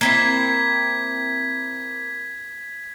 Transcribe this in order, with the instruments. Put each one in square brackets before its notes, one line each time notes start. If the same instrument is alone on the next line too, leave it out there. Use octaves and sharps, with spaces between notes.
[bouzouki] A#3 C4 E4 [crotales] G#6 B6